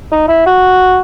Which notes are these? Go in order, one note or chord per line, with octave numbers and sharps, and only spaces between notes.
D#4
E4
F#4